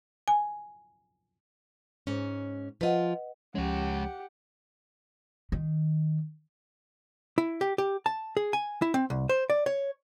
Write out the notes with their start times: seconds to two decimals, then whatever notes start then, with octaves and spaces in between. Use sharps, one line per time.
0.28 G#5
2.07 G#2 C#4
2.81 F3 F4 B4 D#5 F#5
3.55 C#2 F3 G#3 C#4 G4 C#5 F#5
5.52 D#3
7.38 E4
7.61 G4
7.78 G4
8.06 A5
8.37 G#4
8.53 G#5
8.82 E4
8.94 C4
9.10 C2
9.29 C5
9.50 D5
9.66 C#5